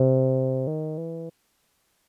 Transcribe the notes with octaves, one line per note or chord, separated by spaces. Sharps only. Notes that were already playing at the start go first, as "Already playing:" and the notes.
Already playing: C3
D#3
E3